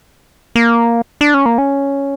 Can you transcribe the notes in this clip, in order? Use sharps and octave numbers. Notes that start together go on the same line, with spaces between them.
A#3
D4
C#4
A#3
C#4